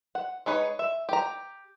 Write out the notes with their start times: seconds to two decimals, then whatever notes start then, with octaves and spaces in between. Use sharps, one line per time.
0.15 F#5
0.46 G#3 D#4 B4 C#5
0.79 E5
1.09 G4 A#5